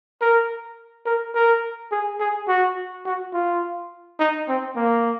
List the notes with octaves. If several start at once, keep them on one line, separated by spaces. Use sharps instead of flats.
A#4
A#4
A#4
G#4
G#4
F#4
F#4
F4
D#4
C4
A#3